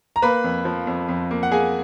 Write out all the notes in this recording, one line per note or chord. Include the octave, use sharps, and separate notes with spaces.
A#5
A#3 B4 B5
F2
F3
F2
F2
A#3
F#5
A#3 G#4 G#5